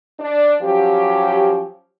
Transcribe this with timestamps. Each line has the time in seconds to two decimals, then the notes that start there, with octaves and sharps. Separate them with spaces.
0.19 D4
0.62 F3 F#3 C#4 G4